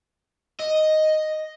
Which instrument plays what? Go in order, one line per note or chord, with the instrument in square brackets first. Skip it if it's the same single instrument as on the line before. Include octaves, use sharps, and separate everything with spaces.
[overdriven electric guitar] D#5